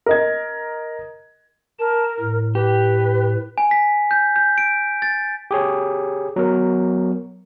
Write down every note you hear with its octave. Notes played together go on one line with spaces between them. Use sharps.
A#4 D#5 G#6
A#4 A5
A2
G4 B4
G#5
B6
G6
G6
D7
A6
G4 G#4 C#5
F#3 B3 A#4